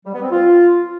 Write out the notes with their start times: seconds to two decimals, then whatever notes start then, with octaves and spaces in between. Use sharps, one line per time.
0.05 G3
0.14 B3
0.22 C4
0.31 F4